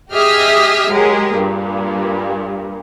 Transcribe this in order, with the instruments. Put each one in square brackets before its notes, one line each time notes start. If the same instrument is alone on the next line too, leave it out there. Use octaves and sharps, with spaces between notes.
[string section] G4 G#4 D#5 E5 D#6 F6
F#3 G#3 G4 G#4 A#4
G2 A#2